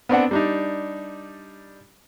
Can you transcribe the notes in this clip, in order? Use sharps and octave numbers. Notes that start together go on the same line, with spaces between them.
B3 C4 D4 F#5
G3 D4 D#4